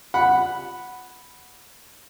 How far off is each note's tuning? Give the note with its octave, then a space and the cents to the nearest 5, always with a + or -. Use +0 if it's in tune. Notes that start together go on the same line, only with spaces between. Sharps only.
F#5 +0 B5 +0